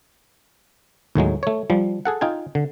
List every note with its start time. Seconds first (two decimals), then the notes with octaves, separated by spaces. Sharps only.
1.15 D#2 A2 F#3 G#3
1.43 A3 C#5
1.70 F3 G3
2.05 G#4 A4 F#5
2.21 D#4 F4 G5 G#5
2.55 D3